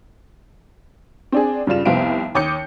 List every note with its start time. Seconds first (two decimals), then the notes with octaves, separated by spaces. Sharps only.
1.32 C4 D4 G#4
1.67 G2 C#3 G3 F4 E7
1.85 F1 C2 B3 C5 F5 D7
2.35 D#2 C#5 D6 D#6 G6 C#7